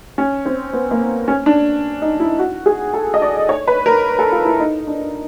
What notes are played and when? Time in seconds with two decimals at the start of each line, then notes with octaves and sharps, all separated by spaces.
0.18 C#4
0.46 C4
0.73 B3
0.91 A#3
1.28 C#4
1.46 D4
2.02 D#4
2.20 E4
2.39 F#4
2.66 G#4
2.94 A4
3.14 D#5
3.22 D5
3.49 C#5
3.67 B4
3.86 A#4
4.19 A4
4.32 F4
4.45 E4
4.60 D#4
4.87 D4